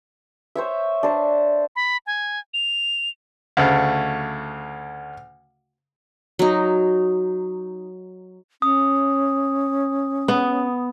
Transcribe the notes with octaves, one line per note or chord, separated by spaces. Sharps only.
C5 C#5 E5
D4 C5
B5
G#5
F7
D2 C#3 A3
F#3 D#4
C#4 D#6
B3